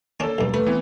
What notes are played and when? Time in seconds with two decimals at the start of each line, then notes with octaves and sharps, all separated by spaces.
0.20 A#3 C#4 D4 A4
0.38 B1 G2
0.54 A3 B4
0.66 E3 B3 C4